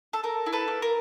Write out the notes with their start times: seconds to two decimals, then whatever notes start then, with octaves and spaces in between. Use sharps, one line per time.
0.13 A4
0.23 A4 A#4
0.46 E4
0.52 A4 B4
0.68 A#3
0.82 A#4